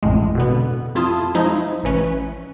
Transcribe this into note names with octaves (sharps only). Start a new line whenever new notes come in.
A1 F2 A2 G#3
B2 D3 B3
F2 E4 F4 A5 C6 D#6
F3 G#3 D#4 E4
A1 E3 C#4 B4